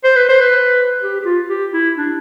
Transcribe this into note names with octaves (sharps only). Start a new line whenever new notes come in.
C5
B4
C5
B4
G4
G4
F4
G4
E4
D4